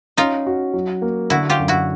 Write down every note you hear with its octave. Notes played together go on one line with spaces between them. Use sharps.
C#4 D#4 F4
F#4
F#3
A#3
D3 E4 F#4
F4 G4
F#2
E4 F#4